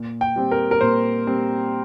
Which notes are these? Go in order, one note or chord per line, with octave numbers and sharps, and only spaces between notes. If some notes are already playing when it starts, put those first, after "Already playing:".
Already playing: A#2
G5
G3 C4
A#4
A#4
A#2 C5
G3 C4